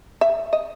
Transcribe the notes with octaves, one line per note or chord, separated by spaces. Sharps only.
E5
D#5